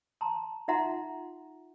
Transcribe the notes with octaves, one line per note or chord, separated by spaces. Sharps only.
A5 A#5 C6
D#4 F4 E5 F#5 A#5 C6